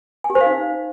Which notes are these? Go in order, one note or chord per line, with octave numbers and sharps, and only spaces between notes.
G#5
G4
C5
F5
D#4